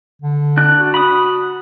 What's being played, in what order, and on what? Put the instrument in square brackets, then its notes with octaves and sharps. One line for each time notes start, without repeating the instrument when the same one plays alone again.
[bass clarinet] D3
[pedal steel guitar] D4 F#6
[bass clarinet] F#4
[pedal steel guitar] B5 D#6